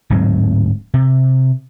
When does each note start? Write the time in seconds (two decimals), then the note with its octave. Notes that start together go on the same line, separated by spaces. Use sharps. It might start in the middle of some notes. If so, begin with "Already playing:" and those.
0.10 D1 G#2 F#3 C4
0.94 C3